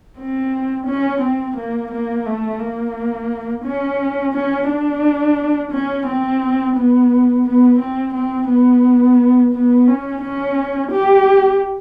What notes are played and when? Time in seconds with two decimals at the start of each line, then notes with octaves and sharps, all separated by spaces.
0.18 C4
0.87 C#4
1.22 C4
1.56 A#3
1.92 A#3
2.26 A3
2.60 A#3
3.64 C#4
4.34 C#4
4.69 D4
5.71 C#4
6.07 C4
6.77 B3
7.45 B3
7.79 C4
8.14 C4
8.50 B3
9.53 B3
9.87 C#4
10.22 C#4
10.92 G4